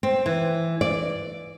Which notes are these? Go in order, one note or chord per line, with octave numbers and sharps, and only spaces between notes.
C4
E3
D5